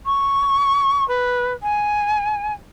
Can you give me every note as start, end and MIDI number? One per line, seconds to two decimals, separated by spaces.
0.06 1.07 85
1.08 1.53 71
1.63 2.53 80